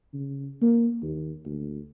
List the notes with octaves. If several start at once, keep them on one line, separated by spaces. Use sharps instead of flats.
C#3
A#3
D#2
D2